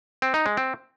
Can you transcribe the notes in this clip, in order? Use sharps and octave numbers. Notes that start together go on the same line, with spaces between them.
C4
D#4
G#3
C4